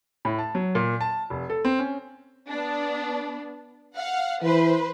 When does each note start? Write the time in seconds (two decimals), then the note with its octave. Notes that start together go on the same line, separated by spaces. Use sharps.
0.25 A2
0.39 A5
0.55 F#3
0.75 A#2
1.01 A5
1.30 F1
1.50 A4
1.65 C4
1.79 C#4
2.49 B3 D4
3.95 F5 F#5
4.42 E3 B4 C5